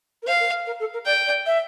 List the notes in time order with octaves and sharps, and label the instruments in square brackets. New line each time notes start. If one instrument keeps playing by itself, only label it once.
[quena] A#4
[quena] C5 [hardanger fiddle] F5
[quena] A#4
A#4
A4
A#4
[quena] D5 [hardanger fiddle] G5
[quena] D5
E5